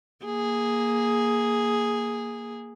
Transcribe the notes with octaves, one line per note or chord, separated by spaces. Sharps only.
A#3 G#4